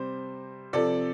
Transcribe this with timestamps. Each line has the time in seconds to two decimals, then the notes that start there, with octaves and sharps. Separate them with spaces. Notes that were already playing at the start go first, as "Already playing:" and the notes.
Already playing: C3 G3 C5
0.73 C3 F3 A4 D5